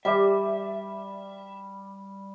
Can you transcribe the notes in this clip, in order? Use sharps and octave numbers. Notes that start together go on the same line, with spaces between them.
G3 D5 E5